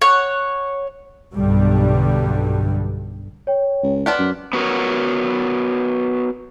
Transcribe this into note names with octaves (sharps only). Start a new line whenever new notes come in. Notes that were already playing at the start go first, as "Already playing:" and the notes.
C#5 F#5
B1 G2 D3 G3
C#5 G5
C#2
B3 D5 A5 C6 F6 B6
F#2
B3 F#4 A#4 C#5